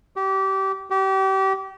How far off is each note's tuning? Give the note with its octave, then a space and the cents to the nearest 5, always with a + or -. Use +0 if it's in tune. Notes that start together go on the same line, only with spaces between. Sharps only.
G4 -25
G4 -30